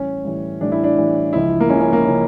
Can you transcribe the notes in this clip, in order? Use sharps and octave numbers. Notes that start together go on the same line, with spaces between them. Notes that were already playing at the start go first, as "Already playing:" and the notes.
Already playing: A2 E3 G3 C#4
A2 E3 G3
A2 E3 G3 D4
E4
D4
A2 E3 G3
C#2 C#3 F3 E4
A#3
C#2 C#3 F3 C#4
C#4
A#3
C#3 F3 C#4